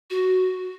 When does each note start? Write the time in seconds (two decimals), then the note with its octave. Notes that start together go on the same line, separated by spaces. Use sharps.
0.10 F#4